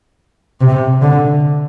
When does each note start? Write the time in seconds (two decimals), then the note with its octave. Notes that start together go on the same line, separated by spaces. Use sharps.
0.61 C3
1.01 D3